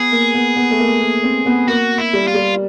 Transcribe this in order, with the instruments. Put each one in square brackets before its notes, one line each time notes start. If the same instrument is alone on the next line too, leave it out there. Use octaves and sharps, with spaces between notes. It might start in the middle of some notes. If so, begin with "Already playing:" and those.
Already playing: [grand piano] B3 [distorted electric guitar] G#4
[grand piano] A#3
B3
B3
A3
A#3
A#3
C4
B3
[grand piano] A#3 [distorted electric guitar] F#4
[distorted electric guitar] E4
[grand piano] G3
[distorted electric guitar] F4
[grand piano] G3